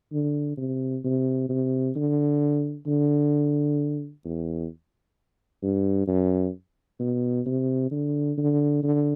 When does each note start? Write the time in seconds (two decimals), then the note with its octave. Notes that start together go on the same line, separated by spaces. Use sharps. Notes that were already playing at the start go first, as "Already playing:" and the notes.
0.13 D3
0.58 C3
1.04 C3
1.49 C3
1.96 D3
2.87 D3
4.25 E2
5.63 G2
6.08 F#2
7.00 B2
7.46 C3
7.91 D3
8.38 D3
8.83 D3